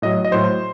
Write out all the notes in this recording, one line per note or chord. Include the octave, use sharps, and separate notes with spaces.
A2 F#3 D#5
D#5
A2 F#3 C5